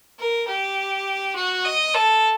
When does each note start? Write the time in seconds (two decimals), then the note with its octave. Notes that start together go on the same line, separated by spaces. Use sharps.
0.20 A#4
0.48 G4
1.36 F#4
1.65 D#5
1.94 A4